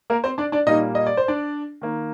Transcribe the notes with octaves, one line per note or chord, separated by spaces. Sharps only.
A#3 A#4
C4 C5
D4 D5
D4 D5
A#2 G3 A#3 D#4 D#5
D#5
D5
C5
D4 D5
D#3 A#3